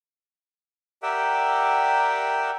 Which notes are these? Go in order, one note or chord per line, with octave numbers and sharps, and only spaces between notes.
G4 A#4 D5 E5 F#5 G5